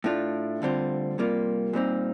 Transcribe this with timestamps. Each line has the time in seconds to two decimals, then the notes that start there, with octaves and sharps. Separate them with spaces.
0.04 A2 A3 D4 F4
0.62 D2 D3 G3 C4 F4
1.18 C3 G3 A#3 F4
1.73 A#2 G3 C4 D#4